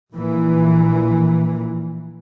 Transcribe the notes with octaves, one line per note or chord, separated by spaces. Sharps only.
A#1 A#2 E3